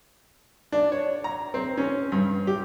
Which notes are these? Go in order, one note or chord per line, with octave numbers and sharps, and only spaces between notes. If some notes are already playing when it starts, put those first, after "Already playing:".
D4
C#5
A#5
C4
C#4
G2
G4